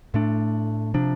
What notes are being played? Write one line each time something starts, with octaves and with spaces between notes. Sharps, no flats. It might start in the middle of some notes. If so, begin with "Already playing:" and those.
A2 A3 D4
C3 F3 D4